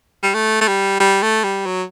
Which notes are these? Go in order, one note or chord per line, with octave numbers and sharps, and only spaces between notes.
G3
A3
A3
G3
G3
A3
G3
F#3